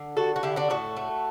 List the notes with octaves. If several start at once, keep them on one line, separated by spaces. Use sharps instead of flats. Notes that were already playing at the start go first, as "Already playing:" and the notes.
Already playing: D3
G3 F#4 A4
F#4
D3 E4 G4
D4 F#4
A2 F#4 A4
A3